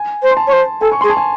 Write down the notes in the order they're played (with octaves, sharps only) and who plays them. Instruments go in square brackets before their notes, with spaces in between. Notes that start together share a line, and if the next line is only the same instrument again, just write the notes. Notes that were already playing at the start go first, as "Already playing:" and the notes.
Already playing: [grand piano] G#5
[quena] C5
[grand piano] C6
A5
[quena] C#5
C5
[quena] A4 [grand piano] G#5
[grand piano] C#6
[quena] G#4 [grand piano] C6
[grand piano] A5
G#5